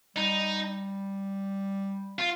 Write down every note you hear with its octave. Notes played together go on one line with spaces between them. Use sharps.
G3 D#4
F4